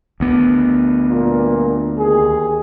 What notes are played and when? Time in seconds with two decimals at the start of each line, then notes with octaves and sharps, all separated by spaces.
0.20 D2 B3
1.09 G2 A#2
1.98 D#2 G#4